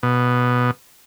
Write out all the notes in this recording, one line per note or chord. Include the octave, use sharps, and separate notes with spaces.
B2